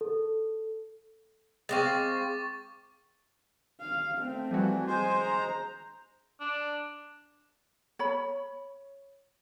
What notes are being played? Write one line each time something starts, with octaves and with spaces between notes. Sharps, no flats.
A4
G#3 C4 F5 C#6 D6 A6
F5
A3 C4
E3 F3 G3 F#4
G#3 C5 G#5
A#5
D4
C#5 B5